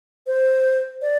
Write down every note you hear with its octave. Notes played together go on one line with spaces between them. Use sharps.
C5
D5